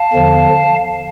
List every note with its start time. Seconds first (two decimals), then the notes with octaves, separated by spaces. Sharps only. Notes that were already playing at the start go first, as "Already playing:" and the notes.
Already playing: F5 A5
0.13 E2 D3 F3